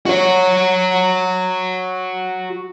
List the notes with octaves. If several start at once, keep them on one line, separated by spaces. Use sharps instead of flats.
F#4 C#5